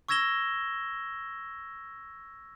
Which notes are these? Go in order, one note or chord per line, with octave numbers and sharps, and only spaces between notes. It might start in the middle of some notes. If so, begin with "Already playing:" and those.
C#6 E6 G#6 A#6 E7 G7